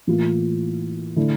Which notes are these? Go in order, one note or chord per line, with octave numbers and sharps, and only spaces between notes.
A2 E3 A#3 F4
D3 A3 E4